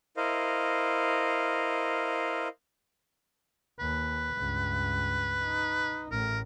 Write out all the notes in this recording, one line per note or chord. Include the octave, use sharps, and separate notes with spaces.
E4 A#4 C5 D#5 F5
D#2 B4
C#2 G2
D#4
A1 A2 A#4